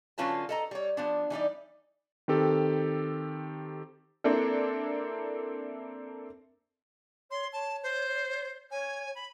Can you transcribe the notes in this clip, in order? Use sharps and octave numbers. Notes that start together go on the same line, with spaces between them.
D3 F#3 C#4 F4 B4 A5
A4 D#5 A#5
G3 C#5
F3 B3 D4
E3 G3 D#4 D5
D#3 C4 G4 A4
A#3 C4 D4 E4 A4
C#5 C6
C#5 A5
C5
C#5 G#5
B5